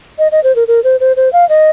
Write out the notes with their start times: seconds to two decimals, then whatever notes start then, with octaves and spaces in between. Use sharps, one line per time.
0.19 D#5
0.32 D#5
0.44 C5
0.56 A#4
0.68 A#4
0.84 C5
1.00 C5
1.16 C5
1.33 F5
1.49 D#5